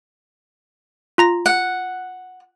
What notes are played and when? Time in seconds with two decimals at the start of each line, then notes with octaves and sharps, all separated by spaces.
1.18 F4 A#5 A#6
1.46 F#5